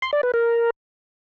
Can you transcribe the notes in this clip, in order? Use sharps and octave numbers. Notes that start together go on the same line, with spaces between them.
C6
D5
B4
A#4